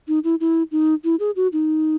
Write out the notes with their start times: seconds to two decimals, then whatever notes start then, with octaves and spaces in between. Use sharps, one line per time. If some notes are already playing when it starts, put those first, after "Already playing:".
0.08 D#4
0.24 E4
0.40 E4
0.72 D#4
1.04 E4
1.20 G#4
1.36 F#4
1.53 D#4